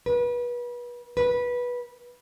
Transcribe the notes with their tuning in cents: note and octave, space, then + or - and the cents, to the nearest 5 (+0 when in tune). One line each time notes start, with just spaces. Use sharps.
B4 -30
B4 -15